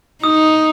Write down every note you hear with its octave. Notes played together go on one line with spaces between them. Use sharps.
D#4 D#6